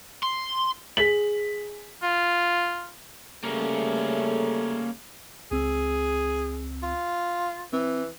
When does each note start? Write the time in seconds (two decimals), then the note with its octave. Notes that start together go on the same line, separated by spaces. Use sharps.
0.23 C6
0.97 G#4 B6 F#7
2.02 F4
3.44 C#3 G3 A3 A#3 C#4
5.51 C#2 C4 G#4 E6
6.83 F4
7.73 E3 C4